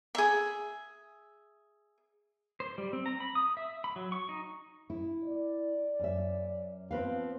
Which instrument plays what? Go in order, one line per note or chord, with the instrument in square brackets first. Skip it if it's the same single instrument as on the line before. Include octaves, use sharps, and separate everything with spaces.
[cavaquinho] G#4 E5
[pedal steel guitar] C5
G3
C4
A#5
B5
D#6
E5
B5
F#3
C#6
D#4
[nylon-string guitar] E4
[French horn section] D5
[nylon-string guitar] F#2 E5
[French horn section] F3 B3 F4 [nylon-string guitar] C4 B4 F5